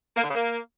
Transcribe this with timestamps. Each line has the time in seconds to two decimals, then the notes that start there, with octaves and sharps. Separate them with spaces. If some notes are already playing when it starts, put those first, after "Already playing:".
0.16 A#3
0.22 D3
0.28 C#3
0.34 A#3